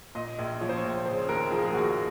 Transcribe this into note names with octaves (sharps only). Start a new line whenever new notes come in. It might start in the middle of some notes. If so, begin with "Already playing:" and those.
A#2 D#5
A#1
F3 C#5
C5
C#5
A#1
C#3 C5
D#2 A#4
F3 G#4
A#4
G#4
D#2 F#4